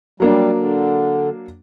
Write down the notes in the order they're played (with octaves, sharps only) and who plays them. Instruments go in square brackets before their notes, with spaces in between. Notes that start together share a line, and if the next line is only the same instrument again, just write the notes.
[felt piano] F#3 A#3 D4 [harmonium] G3
[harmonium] D3